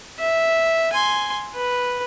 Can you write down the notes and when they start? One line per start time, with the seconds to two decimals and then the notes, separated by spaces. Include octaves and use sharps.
0.19 E5
0.93 G#5 C6
1.55 B4